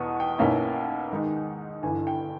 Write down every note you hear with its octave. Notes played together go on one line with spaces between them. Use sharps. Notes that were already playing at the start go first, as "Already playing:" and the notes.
Already playing: E2 B2 B3 C#6 D#6
G5
B1 B2 A#3 C#4 E4
G#2 D#3 G#3 D#4
G1 G2 E3 G#5
G5